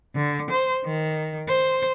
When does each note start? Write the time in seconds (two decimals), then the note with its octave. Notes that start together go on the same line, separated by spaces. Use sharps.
0.15 D3
0.51 C5
0.85 D#3
1.49 C5